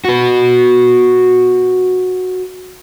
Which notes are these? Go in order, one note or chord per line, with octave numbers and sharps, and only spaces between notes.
F#4 B4